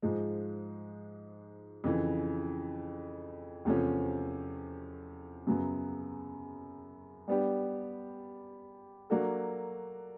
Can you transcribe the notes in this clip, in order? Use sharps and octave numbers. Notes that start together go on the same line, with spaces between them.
G#2 F3 G#3
F2 C#3 E3
E2 C3 F3 A3 C#4
F#2 C#3 F#3 B3
G3 B3 D4 G4
F#3 A#3 D4 F#4 A4